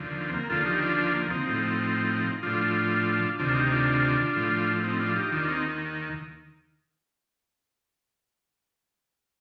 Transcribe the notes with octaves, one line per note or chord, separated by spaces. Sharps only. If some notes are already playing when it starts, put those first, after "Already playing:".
Already playing: D#2 D3 F3
C4
A#3
D#2 D3 F3 F4 A4
D#4 G4
D4 F4
D4 F4
A#3
C4 D#4
A2 F3
A2 F3 D4 F4
D2 C3 D#3 D4 F4
D#4 G4
D4 F4
A2 F3
C4 D#4
D4 F4
D#4 G4
D#2 D#3 D4 F4
C4 D#4